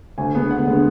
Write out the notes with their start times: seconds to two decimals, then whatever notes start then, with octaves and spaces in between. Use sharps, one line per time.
0.18 D2 G#5
0.34 D3 G#3 B3
0.51 D2 F#5
0.66 D3 G#3 B3